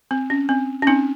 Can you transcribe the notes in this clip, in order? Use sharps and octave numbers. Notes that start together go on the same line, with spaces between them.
C4
C#4
C4
C#4
C4 D#4